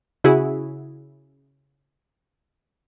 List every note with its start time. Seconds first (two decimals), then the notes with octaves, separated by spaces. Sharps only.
0.24 C#3 E4 F#4 G#4